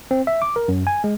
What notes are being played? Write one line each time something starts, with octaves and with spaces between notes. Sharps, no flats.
C4
E5
D6
A#4
F#2
G#5
G#3